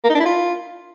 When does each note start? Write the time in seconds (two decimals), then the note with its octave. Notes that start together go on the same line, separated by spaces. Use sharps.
0.04 A#3
0.10 D#4
0.15 D4
0.20 E4
0.25 F4